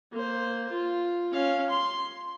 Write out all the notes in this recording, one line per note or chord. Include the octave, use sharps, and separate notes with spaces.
A#3 C5
F4
C#4 F5
C6